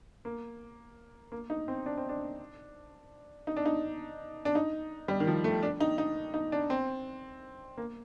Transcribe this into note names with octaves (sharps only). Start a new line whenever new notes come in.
A#3
A#3
D#4
C4
D4
C4
D4
D#4
D4
D#4
D4
D#4
G3
D#3
F3
A3
D4
D#4
D#4
D#4
D4
C4
A#3